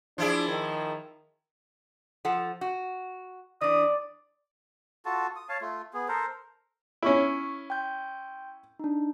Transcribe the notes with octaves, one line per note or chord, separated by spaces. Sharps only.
F3 D4 E4 G#4
D#3
F3 A4 F#5
F#4
E3 D4 D5 D#6
F4 F#4 A4 A5
D#6
C#5 F5 A5
A3 F4
B3 G#4
A4 A#4 C5
C#4 E4 C#6 F6
G5 C6 G6
D4 D#4